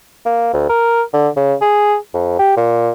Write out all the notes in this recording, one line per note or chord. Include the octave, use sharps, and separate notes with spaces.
A#3
D2
A#4
D3
C#3
G#4
F2
G4
A#2